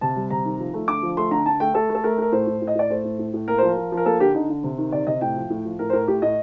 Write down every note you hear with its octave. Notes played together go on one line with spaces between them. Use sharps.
C3 A5
G3
C3 A#5
D#3
F3
A3
D3 D6
F3
A3 C6
D3 A#5
D3 A5
A3 G5
A3 A4
A3
A4
A3 A#4
A3 A#4
A2 C5
A2
A2
D#5
A2 D5
A3 C5
A2
A2
A2
A#3 A#4
F3 C5
A#4
F3
F3
A#4
A#3 A4
D3 G4
D3 D#4
D3
C3
D#3
C3 D5
C3 D#5
A2 G5
F3
A2
F3
A2 A#4
C5
A2 A#4
A2 G4
A2 D#5